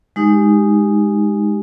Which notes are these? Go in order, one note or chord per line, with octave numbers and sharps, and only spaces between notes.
G#3 D#4 G4